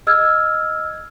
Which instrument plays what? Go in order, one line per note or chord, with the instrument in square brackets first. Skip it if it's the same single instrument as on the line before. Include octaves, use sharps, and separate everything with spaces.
[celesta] D#5 E6 F6 G#6